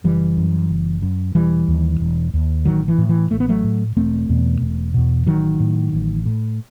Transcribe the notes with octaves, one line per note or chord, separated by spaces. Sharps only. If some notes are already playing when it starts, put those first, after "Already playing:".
F#1 E3 G3
F#2
F#1
F#2
E1 E3 G3
D#2
E1
D#2
A1 D#3 F#3
E3
A2
E3
A1 A3
B3
F#3 A3
A2
E1 A3 C4
E2 B2
E1
E2 B2
A1 D#3 F#3
A2
A1
A2